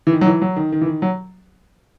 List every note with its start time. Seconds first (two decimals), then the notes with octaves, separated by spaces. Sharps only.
0.07 E3
0.12 D#3
0.21 F#3
0.26 E3
0.42 F#3
0.56 D#3
0.72 D#3
0.81 E3
0.86 D#3
1.02 F#3